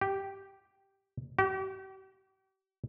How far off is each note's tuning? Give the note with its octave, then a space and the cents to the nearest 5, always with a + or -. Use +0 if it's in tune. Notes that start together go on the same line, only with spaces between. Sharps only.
G4 -5
G4 -40